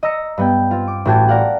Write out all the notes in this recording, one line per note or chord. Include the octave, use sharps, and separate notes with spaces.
D#5 A#5 E6 A#6 C#7
G2 B3 G5
C4 F4
D6
A1 A2 F#4 G5 A5 G#6
A#4 D5 F5 F#5 A5